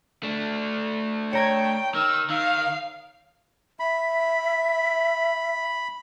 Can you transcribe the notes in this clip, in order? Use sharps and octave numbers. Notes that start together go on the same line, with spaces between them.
A3 D4
C#5 G5 A#5 G#6
D#3 E6
D#3 F5
E5 B5